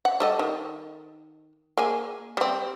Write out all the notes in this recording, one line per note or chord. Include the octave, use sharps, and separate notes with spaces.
F#5
G3 A4 D#5
D#3
A#3 G#4 G#5
G3 C4